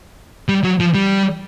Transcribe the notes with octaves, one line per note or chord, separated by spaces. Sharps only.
G3
F#3
F3
G3